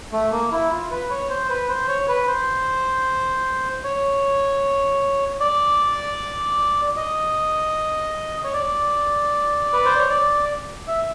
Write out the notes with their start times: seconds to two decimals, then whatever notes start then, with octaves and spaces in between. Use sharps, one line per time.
0.12 A3
0.32 A#3
0.52 E4
0.71 F4
0.91 B4
1.10 C#5
1.30 C5
1.49 B4
1.69 C5
1.88 C#5
2.08 B4
2.28 C5
3.84 C#5
5.40 D5
6.96 D#5
8.44 C#5
8.53 D5
9.73 B4
9.85 C5
9.98 C#5
10.10 D5
10.87 E5